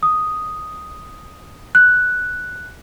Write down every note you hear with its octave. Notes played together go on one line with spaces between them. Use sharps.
D#6
F#6